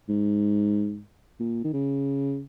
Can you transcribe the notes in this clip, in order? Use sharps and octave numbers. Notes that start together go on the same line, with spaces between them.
G#2
A#2
D#3
C#3